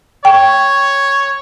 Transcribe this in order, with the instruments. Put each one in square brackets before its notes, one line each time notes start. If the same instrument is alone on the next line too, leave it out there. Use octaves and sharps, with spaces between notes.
[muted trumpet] C#5 [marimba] G5